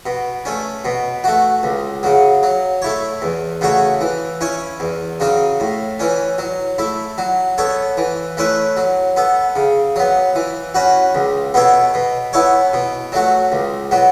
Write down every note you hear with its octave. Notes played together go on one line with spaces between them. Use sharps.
B2
A3 C#4
B2
A3 F#4
C#2
C#3 F#3
F#3
A3 E4 C#5
E2
C#3 A3 F#4 C#5
E3
C#4 E4 C#5
E2
C#3 F#3 C#4
A2
E3 C#4
F#3
A3 E4
F#3
B3 A4 C#5
E3
A3 C#4 E4 B4
F#3
B3 A4
C#3
F#3 B3
E3
C#4 F#4 B4
C#2
B2 B3 A4 C#5
B2
B3 E4 A4 C#5
B2
F#3 A3 F#4
C#2
B2 F#3 B3